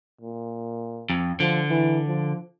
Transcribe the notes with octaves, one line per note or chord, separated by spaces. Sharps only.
A#2
F2
D3 F3
E3
F3